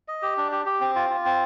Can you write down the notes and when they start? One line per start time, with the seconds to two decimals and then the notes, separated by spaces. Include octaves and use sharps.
0.08 D#5
0.22 G4
0.37 D4
0.52 G4
0.66 G4
0.80 C4
0.96 F4
1.10 F4
1.25 C4